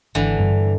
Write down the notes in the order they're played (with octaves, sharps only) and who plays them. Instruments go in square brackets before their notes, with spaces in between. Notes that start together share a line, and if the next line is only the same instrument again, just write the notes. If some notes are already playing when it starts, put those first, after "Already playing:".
[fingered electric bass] G#1 [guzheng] D3 E3
[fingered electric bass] G2